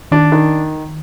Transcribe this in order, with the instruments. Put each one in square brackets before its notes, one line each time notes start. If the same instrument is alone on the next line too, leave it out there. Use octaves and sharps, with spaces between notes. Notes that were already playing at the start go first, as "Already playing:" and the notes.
[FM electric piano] D#3 [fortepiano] D4
[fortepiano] D#3